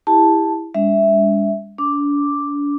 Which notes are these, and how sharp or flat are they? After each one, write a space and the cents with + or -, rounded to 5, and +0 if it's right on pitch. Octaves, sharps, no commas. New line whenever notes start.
E4 +0 G4 +35 A5 +0
G#3 -40 D4 -45 E5 +0
D4 -40 D6 +0